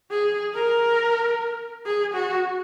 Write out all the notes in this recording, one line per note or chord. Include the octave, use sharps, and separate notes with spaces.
G#4
A#4
G#4
F#4